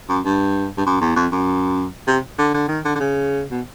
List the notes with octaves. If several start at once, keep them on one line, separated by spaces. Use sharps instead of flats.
F#2
G2
G2
F#2
E2
F2
F#2
C3
D3
D3
D#3
D3
D3
C#3
B2